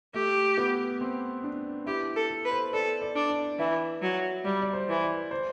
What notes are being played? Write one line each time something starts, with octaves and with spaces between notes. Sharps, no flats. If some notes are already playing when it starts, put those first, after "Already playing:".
A3 G4
B3
C4
D4
E4 G4
A4
A4
B4
C5
A4 D5
D5
D4
D5
E3 E5
F#3
G3 D5
D5
C5
E3
D5
C5